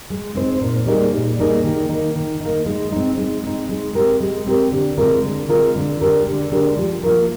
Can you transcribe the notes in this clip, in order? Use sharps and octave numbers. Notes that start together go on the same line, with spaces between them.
G#3
C4 D#4 G#4 C5
A#2
G3 A#3 D#4 G#4
A#2
G3 A#3 D#4 G#4
D#3
A#3 D#4
D#3
D#4
A#3
G#3
C4 D#4
G#3
C4 D#4
G#3
C4 G4 A#4
G#3
C4 G4 A#4
D3
G#3 C4 F4 A#4
D3
G#3 C4 F4 A#4
D3
G#3 D4 G4 A#4
D3
G#3 D4 G4 A#4
F3
A#3 F4 A#4